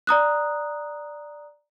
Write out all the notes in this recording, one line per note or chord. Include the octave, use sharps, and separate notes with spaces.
D5 A#5 D#6 F#6